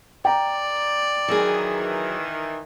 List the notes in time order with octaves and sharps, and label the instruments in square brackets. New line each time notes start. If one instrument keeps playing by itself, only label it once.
[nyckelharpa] D5 [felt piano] G5 A#5
[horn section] D#3 E3 [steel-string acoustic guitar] F#3 G#4